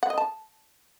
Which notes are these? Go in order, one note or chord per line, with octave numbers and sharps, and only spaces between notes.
F#5
D#5
A5